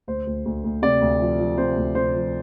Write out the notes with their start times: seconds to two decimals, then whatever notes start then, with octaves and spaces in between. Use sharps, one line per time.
0.07 D2 C5
0.27 D2
0.45 D2
0.64 D2
0.82 C3 D5
1.01 D2
1.20 F3
1.39 F3
1.58 C3 C5
1.77 D2
1.95 C3 C5
2.14 F3